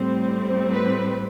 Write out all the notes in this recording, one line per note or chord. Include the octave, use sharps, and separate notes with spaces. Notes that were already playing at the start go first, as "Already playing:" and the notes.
Already playing: A2 G3 C4
B4